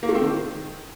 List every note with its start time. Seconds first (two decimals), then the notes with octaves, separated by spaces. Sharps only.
0.03 A#3
0.09 A3
0.15 C4
0.21 D#3